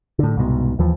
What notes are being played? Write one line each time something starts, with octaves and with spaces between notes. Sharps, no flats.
A2 D3
C2 G#2 B2
D#2 E3 F3